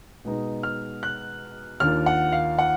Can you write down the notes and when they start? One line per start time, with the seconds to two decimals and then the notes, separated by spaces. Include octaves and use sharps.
0.25 B2 G#3 B3 D#4
0.63 F6
1.03 F#6
1.80 D#2 D#3 A#3 D4 F4 F6
2.06 F#5
2.32 F5
2.59 F#5